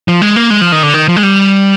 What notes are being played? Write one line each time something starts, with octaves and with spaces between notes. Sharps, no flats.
F3
G#3
A#3
G#3
F3
D#3
D3
D#3
F3
G#3
G3